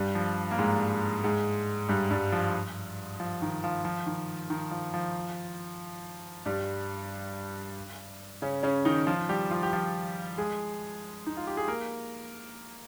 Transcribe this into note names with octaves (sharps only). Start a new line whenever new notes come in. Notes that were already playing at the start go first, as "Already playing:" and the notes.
Already playing: G2 G3
F3
A#3
G#2 G#3
G#2 G#3
G2 G3
G2 G3
F3
F3
D#3
F3
F3
D#3
D#3
F3
F3
G2 G3
C#3 C#4
C#3 C#4
D#3 D#4
F3 F4
G3 G4
F3 F4
G4
F3 F4
G#3 G#4
D#4
F4
G4
G#4
A#3 A#4